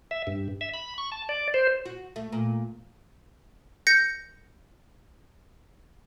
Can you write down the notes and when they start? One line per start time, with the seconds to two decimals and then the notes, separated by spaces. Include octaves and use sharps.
0.11 E5
0.27 G2
0.61 E5
0.74 B5
0.98 C#6
1.12 A5
1.29 D5
1.54 C5
1.86 F#4
2.16 A3
2.32 A#2
3.87 G6 A#6 C#7